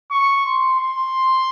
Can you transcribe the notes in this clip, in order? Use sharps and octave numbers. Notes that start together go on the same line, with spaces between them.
C#6
C6
C6